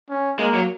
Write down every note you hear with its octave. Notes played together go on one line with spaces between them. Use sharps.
C#4
G#3 A#3
F#3